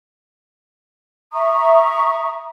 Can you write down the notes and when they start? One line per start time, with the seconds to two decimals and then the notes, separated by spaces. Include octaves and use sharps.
1.33 E5 A#5 C#6 D#6